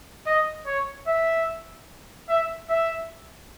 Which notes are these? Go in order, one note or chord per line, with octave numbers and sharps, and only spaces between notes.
D#5
C#5
E5
E5
E5